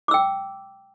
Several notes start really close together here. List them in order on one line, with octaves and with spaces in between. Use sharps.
D6 E6 G5